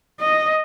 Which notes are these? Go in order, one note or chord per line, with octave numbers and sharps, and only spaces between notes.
D#5